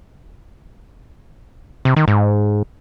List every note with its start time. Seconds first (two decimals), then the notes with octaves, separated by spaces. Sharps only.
1.85 C3
1.96 D#3
2.08 G#2